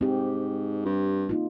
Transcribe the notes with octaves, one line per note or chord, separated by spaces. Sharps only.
G#2 C4 G4
G2
A#3 D#4 F4